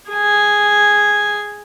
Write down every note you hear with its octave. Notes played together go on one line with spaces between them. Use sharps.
G#4 G#5